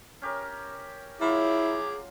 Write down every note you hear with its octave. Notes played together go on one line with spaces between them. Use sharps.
C#4 G4 A#4
F#3 E4 F4 G#4 D6